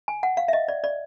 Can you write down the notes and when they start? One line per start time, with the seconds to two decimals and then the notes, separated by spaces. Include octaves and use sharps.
0.08 G#5
0.23 F#5
0.37 F5
0.48 E5
0.53 D#5
0.68 D5
0.84 D5